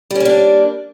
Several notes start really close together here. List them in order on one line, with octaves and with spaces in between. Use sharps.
G3 C#4 A#3 D4